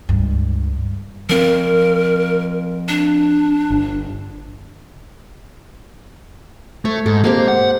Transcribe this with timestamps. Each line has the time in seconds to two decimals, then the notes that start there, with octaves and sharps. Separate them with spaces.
0.09 C#2 G2
1.29 F3 C4 A#4
2.88 D4
3.70 G1
6.85 A3 C#5
7.06 G#2 A4
7.24 G#3 A#3 C4 G4
7.48 F#5